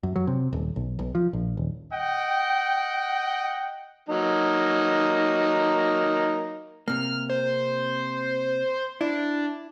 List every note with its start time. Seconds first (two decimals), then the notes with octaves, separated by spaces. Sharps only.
0.03 F#2
0.16 F#3
0.27 C3
0.53 D#1
0.76 B1
0.99 B1
1.15 F3
1.33 A#1
1.57 D#1
1.92 D#5 F#5 G5
4.09 F#3 A#3 D#4
6.88 C3 A#3 F6
7.30 C5
9.01 D4 E4